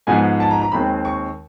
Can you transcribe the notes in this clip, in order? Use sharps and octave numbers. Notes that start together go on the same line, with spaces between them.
G#2 F3 G#3 B3 G#5
A5
A#5
A#5
D#2 D#3 G#3 C4 B5
C#6